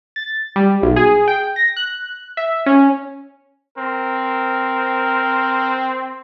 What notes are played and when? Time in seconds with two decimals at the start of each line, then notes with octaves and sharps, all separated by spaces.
0.16 A6
0.56 G3
0.82 B1
0.96 G#4
1.28 G5
1.56 A#6
1.77 F#6
2.37 E5
2.66 C#4
3.78 C4 A#4